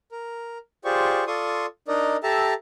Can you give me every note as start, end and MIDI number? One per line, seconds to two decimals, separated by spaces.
0.12 0.58 70
0.85 1.24 65
0.85 1.24 67
0.85 1.24 68
0.85 1.24 72
0.85 1.24 74
0.85 1.24 85
1.27 1.66 65
1.27 1.66 69
1.27 1.66 74
1.27 1.66 84
1.27 1.66 85
1.27 1.66 87
1.88 2.16 62
1.88 2.16 63
1.88 2.16 70
1.88 2.16 74
1.88 2.16 75
2.23 2.54 67
2.23 2.54 69
2.23 2.54 76
2.23 2.54 81
2.23 2.54 82